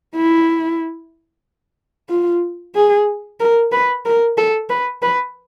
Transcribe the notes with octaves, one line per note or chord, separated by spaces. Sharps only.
E4
F4
G#4
A#4
B4
A#4
A4
B4
B4